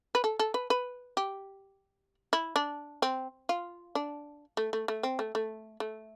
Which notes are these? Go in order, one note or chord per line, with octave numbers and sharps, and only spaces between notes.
B4
A4
A4
B4
B4
G4
E4
D4
C4
F4
D4
A3
A3
A3
C4
A3
A3
A3